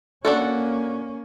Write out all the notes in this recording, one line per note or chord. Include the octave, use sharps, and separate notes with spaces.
A#3 C#4 D4 F#4 A4